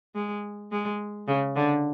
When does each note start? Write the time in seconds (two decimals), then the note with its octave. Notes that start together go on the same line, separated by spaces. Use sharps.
0.15 G#3
0.72 G#3
1.28 C#3
1.56 D3